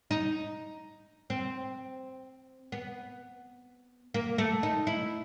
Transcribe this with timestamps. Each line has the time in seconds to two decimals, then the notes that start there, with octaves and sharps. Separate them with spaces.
0.11 D#4
1.30 C4
2.72 B3
4.14 A#3
4.38 A3
4.63 D#4
4.87 E4